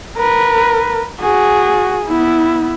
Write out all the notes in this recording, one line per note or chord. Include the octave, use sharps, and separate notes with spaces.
A#4 B4
F#4 G#4
B3 E4